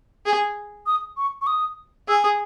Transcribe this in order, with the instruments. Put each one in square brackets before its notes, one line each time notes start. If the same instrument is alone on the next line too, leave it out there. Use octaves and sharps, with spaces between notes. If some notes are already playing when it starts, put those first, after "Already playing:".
[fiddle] G#4
[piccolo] D#6
C#6
C#6
D#6
[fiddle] G#4 [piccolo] E6
[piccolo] D#6